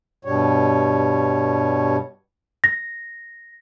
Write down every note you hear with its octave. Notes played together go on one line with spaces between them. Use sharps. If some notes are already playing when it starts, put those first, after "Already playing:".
G2 B2 G3 C#5
A#6